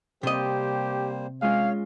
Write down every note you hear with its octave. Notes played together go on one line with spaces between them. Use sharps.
C3 G3 A#3 G4 C5 D#5
G#3 C#4 F4 C#5 F5